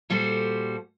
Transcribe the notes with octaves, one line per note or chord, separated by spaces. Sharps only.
A#2 G3 F#4 A4 C5